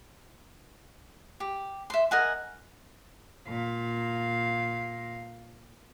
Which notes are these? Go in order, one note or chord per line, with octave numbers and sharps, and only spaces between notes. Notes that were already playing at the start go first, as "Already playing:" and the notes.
G4
E5 C6
A#4 D#5 F#5 G#5
A#2 F5